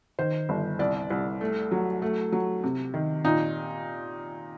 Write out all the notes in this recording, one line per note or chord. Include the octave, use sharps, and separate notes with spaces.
D#3 C5
G1
C2 D5
C2
A3
F#3
A3
F#3
C3
D#3
A#2 D#4